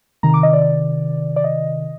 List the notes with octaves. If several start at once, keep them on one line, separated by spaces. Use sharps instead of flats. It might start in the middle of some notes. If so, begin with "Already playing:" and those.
C3 D#3 A#5
D6
D#5
D5
D5
D#5